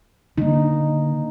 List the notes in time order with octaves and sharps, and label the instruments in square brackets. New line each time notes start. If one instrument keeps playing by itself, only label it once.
[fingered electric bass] D3 [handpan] A#3 D#4